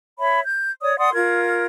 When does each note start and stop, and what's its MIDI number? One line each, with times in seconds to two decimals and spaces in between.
0.19 0.40 73
0.19 0.40 76
0.19 0.40 83
0.45 0.70 91
0.82 0.96 73
0.82 0.96 74
0.82 0.96 87
0.98 1.12 74
0.98 1.12 78
0.98 1.12 84
0.98 1.12 87
1.13 1.66 65
1.13 1.66 70
1.13 1.66 92